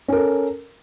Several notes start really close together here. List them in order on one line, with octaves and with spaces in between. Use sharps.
C#4 A#4 A4